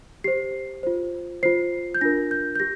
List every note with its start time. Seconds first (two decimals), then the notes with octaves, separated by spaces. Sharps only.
0.24 G4 C5 C7
0.83 F4 C5
1.43 F4 C5 C7
1.95 G6
2.01 D4 F4 A#4 A#6
2.31 G6
2.55 G6
2.60 G4 A#6